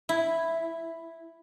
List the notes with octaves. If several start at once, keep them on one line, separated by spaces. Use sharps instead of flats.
E4